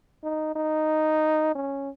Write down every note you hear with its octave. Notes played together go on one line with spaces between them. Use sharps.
D#4
D#4
C#4